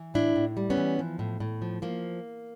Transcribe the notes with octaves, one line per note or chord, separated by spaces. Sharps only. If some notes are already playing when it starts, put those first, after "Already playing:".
Already playing: E3
A2 D4 E4
A2
G3
B3 C#4
E3
F3
A2
A2
F3
F3 A#3